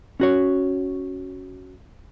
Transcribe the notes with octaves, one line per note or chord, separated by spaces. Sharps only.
C#4 F#4 C#5